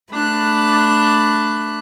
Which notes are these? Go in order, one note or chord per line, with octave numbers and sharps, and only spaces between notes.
A3 D4 B5 F#6